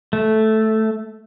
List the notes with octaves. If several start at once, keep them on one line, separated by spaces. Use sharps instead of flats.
A3